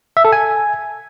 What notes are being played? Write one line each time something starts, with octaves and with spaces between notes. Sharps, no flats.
E5
A4
G#5